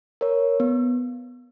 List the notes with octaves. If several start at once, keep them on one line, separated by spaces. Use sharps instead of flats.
A#4 C#5
B3